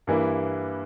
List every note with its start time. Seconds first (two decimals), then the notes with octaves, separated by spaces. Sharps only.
0.07 G2 E3 A#3 E4